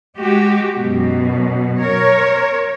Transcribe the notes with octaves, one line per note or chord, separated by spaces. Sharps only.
G#3 F#4 G4
F#2 B2
A#4 C#5